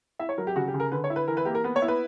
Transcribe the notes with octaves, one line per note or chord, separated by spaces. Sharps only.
E4 E5
C#5
F#3 A#4
G4
C#3 F#4
G4
C#3
A#4
D3 B4
C#5
E4
B4
E3 A#4
B4
A#3 G4
A#4
B3 B4
C#5
E4
B4